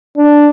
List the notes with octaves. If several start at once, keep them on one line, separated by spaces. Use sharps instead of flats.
D4